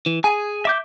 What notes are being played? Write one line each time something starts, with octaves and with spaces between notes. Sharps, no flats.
E3
G#4 G#5
E5 D6 G6